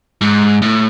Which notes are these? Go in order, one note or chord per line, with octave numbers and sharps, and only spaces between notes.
G#2
A2